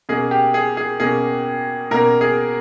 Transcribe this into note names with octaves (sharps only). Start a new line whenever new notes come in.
B2 A#3 C#4 G#4
G4
G#4
G#4
B2 A#3 C#4 G#4
B2 A#3 C#4 A#4
G#4